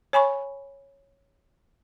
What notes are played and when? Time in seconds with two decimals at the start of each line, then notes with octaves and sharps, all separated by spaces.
0.13 C#5 G#5 B5 C#6